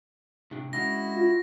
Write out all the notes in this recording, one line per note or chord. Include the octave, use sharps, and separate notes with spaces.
A2 C3 D4
G#3 C#4 D4 E4 F#4 A#6
F4